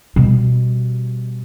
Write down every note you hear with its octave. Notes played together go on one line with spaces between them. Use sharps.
B2 G3